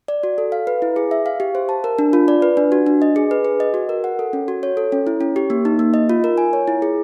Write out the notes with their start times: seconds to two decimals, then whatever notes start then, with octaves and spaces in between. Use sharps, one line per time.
0.08 D5
0.23 F#4
0.38 A4
0.52 F5
0.67 B4
0.82 E4
0.96 G#4
1.11 E5
1.26 F5
1.40 G4
1.55 C5
1.69 A5
1.84 A#4
1.99 D4
2.13 F4
2.28 D5
2.42 B4
2.57 D4
2.72 F#4
2.86 D4
3.02 D#5
3.16 G#4
3.31 B4
3.45 G#4
3.60 D#5
3.74 F#4
3.89 A#4
4.04 F#5
4.19 A4
4.33 C#4
4.48 F#4
4.63 C#5
4.77 A4
4.92 C#4
5.07 E4
5.21 C#4
5.36 G4
5.50 A#3
5.65 D#4
5.79 A#3
5.94 D#5
6.09 F4
6.24 A#4
6.38 G#5
6.53 C#5
6.67 E4
6.82 G#4